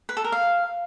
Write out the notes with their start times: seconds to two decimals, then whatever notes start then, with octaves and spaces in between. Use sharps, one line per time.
0.09 B4
0.17 A4
0.25 A#4
0.32 F5